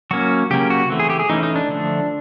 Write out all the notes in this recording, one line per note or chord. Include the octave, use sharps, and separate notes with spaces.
F#3 A#3 C#4 F#4
C#3 F#3 A#3 C#4 G4
F#4
E3 A3 C4
G#4
G4
G#4
E3 A3 C#4 D#4
D#4
D4
D3 F3 A3